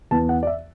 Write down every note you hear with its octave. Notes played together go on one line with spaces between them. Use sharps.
E2 E3 B3 A5
F#5
D5
E5